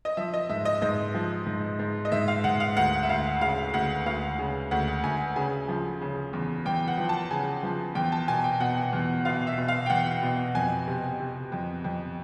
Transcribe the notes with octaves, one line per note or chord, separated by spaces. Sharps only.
D#5
F3 E5
D#5
G#2 E5
D#5
G#2 D#5
F3
G#2
G#2
D#5
G#2 E5
F5
G#2 F#5
F5
D2 F#5
E5
D2 F5
C#3 F5
D2 F#5
D2 F5
C#3
D2 F#5
D2 G#5
C#3 G#5
F3
C#3
E2
E2 G5
F#5
F3
A5
C#3 G#5
F3
E2 G5
A5
B2 G#5
G5
B2 F#5
E2
B2 F5
E5
B2
F5
G5
E2 F#5
B2
F2 G#5
C3
C3
F2
F2